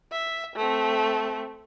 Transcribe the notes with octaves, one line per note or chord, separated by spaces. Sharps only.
E5
A3 C4